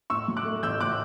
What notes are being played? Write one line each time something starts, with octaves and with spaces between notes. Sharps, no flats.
A2 C#6 E6
F#3
D6 F#6
A3
A1 E6 G6
A2 D6 F#6